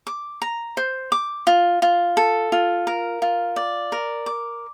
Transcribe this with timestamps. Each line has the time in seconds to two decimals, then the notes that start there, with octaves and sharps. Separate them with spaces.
0.07 D6
0.42 A#5
0.77 C5
1.12 D6
1.47 F4
1.82 F4
2.17 A4
2.52 F4
2.87 A#4
3.22 F4
3.56 D5
3.92 A#4
4.26 D6